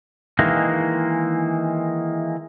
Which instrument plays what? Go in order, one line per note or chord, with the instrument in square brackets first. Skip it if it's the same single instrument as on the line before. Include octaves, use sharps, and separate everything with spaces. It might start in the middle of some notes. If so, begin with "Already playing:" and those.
[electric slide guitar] D#3 E3 G#3 A#3